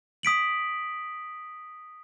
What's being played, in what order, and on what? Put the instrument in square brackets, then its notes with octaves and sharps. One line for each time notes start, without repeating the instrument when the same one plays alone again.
[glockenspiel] D#6 B6 D7 F#7